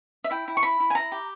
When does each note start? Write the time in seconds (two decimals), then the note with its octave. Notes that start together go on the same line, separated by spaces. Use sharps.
0.24 E5
0.31 E4 G5
0.48 E4
0.57 C#6
0.63 E4 B5
0.80 E4
0.90 G#5
0.95 E4 A#5
1.12 G4